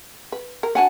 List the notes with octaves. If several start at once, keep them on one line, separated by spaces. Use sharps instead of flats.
B4
A#4
D4 F#4 F#5 G#5 A5